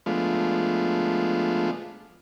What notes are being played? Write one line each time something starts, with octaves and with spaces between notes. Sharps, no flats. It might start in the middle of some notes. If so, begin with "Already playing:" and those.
F3 G#3 A3 B3 D4 F4